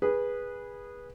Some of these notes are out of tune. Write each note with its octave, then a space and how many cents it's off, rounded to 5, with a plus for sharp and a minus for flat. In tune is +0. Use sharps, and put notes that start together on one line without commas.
G#4 -20 B4 -15